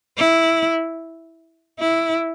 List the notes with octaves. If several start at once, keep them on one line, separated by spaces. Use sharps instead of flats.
E4
E4